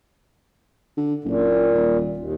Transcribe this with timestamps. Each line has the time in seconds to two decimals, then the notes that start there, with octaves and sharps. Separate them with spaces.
0.97 D3
1.24 F#1 A#2
1.73 D#1
2.17 D#2